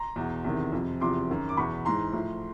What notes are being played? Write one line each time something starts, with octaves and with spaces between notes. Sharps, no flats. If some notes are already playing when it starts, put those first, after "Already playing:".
Already playing: A#5 C6
E2 B2
E2 C3 D#3
F2 C3 F3
E2 C3 F3 C6 D6
F#2 D#3
D6
E2 B2 B5 C#6
G#2 E3 A#5 C6
A2 F3